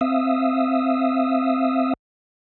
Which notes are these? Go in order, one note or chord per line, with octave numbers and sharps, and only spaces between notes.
C4 E5 F5 D#6 E6